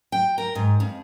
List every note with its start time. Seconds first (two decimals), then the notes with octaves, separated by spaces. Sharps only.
0.12 G5
0.38 A#4
0.55 G#2
0.80 F2